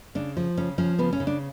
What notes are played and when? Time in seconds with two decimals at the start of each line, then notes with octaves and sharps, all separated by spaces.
0.15 C#3 D4
0.37 F3
0.57 C#3 C#4
0.78 F3 C#4
0.99 C#3 B3
1.13 C#4
1.20 C#3
1.27 D4